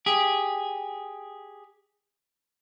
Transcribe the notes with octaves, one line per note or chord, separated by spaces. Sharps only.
G4 G#4